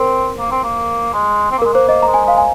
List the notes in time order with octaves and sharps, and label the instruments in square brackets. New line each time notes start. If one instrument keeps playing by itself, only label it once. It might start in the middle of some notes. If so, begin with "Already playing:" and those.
Already playing: [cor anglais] C4 [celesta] A#4 C5
[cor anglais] A#3
C4
A#3
G#3
C4
A#3
[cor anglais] G#3 [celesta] A#4
[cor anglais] A#3 [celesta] C5
[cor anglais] A#3 [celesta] D#5
[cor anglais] G#3 [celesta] A#5
[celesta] G#5
[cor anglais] G#3 [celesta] F5
[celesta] G#5